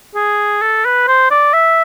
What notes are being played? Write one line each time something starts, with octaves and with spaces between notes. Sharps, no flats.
G#4
A4
B4
C5
D5
E5